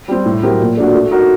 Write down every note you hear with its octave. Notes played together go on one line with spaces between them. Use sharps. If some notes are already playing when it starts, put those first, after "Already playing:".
G3 C4
A2
F#3 C4 G4 A#4
A#2
A3 D4 F#4
A3
D#4 F#4 A#4 D#5